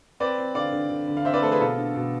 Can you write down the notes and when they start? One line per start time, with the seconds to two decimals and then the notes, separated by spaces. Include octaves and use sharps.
0.20 C4 B4 D5
0.38 C4
0.55 D3 D5 F5
0.72 D3
0.90 D3
1.08 D3
1.17 F5
1.25 C4 C5 E5
1.34 B4 D5
1.42 A3 A4 C5
1.52 G#4 B4
1.60 B2 F4 A4
1.78 D4
1.95 B2